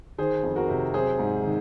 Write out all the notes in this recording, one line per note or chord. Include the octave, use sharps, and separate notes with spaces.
D#3 G#4 C5
F2
F#4 A#4
C3
F#3 G#4 C5
G#2
D#3